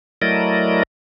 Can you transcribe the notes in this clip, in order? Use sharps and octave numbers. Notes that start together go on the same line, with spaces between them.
F#3 A3 E4 A#4 D5 D#5